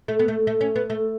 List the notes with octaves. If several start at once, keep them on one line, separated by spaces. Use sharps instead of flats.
A3
B3
A3
A3
C#4
B3
A3